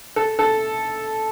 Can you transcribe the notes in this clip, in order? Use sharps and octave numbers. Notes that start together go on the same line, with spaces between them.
A4
A4